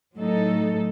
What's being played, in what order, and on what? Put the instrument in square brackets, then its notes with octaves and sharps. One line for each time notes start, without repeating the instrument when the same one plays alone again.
[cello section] A2 F#3 A3 D#4 A4